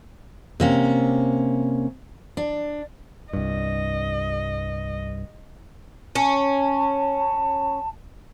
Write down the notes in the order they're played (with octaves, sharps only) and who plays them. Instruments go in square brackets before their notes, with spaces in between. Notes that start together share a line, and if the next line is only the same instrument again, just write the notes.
[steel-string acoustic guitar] C3 A#3 C#4
D4
[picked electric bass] C2 G2 [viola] D#5
[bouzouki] C#4 [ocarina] A5